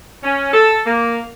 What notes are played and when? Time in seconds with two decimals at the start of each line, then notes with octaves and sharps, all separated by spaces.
0.23 C#4
0.53 A4
0.86 A#3